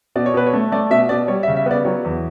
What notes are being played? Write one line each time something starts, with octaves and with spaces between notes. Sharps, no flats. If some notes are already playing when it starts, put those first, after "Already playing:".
B2 D5
C#5
B2 B4
C#5
A3
A3 D5
B2 E5
B2 D5
G3 C#5
E5
C#3
E5
B3 D5
F#3 C#5
E2